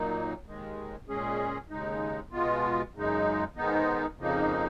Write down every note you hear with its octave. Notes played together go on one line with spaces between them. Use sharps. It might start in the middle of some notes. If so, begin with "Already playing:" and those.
Already playing: A#2 F#3 A#3 D#4
D#2 D#3 G#3
A#2 G#3 C#4 G#4
D#2 C#3 G#3 D#4
B2 G#3 B3 F4
F#2 C#3 G#3 D#4
G#2 D#3 G#3 B3 D#4
F2 C#3 F3 A#3 D#4